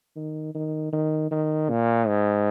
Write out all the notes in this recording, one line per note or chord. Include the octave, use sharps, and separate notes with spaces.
D#3
D#3
D#3
D#3
A#2
G#2